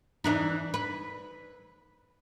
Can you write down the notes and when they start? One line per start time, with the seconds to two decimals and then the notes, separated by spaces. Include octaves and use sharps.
0.24 E3 D4 D#4
0.74 B4